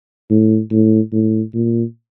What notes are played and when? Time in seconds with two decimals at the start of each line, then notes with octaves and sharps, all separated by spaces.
0.30 A2
0.71 A2
1.13 A2
1.54 A#2